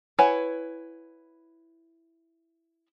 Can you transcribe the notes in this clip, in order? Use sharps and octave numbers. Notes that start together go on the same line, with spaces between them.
E4 B4 C#5 F#5 G#5